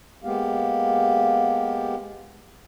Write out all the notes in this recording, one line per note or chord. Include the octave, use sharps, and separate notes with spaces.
G#3 A#3 B3 G4 F5